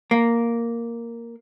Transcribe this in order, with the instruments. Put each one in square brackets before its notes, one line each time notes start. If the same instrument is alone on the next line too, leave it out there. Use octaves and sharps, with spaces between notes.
[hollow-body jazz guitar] A#3